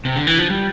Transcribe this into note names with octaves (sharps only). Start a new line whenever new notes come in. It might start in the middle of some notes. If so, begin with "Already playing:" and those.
C3
D3
E3
F3
G3